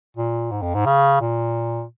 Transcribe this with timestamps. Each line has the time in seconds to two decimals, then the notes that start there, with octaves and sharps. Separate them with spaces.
0.17 A#2
0.51 G#2
0.62 F2
0.75 G#2
0.86 C#3
1.21 A#2